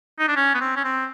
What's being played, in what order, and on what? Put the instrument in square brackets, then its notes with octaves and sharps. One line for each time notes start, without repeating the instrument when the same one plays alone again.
[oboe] D#4
D4
C#4
B3
C4
C#4
C4